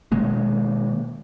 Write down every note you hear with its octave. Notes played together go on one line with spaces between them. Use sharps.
B2 D#3 G#3 A#3